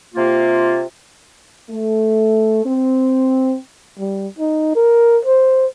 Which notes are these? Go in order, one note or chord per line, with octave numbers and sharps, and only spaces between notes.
C3 A#3 F4
A3
C4
G3
D#4
A#4
C5